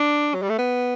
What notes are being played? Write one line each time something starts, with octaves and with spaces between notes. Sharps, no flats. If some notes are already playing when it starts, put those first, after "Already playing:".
Already playing: D4
F#3
G3
A3
B3